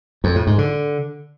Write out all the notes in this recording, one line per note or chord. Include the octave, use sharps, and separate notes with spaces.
F2
A2
G#2
D3